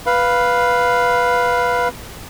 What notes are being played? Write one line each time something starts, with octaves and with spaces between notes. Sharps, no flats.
B4 F5